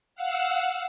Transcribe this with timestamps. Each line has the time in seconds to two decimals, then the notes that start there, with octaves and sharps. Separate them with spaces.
0.15 F5 F#5 E6